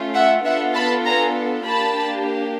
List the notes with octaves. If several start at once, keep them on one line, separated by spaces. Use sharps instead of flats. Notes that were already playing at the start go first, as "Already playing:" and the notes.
Already playing: A3 C#4 F4
E5 F#5
B3 D4 F4 A4 E5 F#5
A5 B5
G#5 A#5
A#3 D4 G4 A5 B5